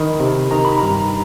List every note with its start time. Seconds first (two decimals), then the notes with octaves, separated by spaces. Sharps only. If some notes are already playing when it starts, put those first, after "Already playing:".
Already playing: D#3 B5
0.20 C3
0.51 D#3 A#5
0.65 B5
0.78 G2 A#5